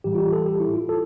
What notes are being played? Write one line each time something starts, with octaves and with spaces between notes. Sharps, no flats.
A2 E3 G3 G4
F4
G4
A4
G4
E4
F4
A4